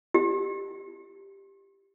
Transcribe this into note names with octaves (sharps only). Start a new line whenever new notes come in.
G4